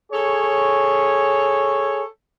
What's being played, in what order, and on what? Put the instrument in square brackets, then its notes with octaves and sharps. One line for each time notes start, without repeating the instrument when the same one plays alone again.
[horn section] G#4 A4 C#5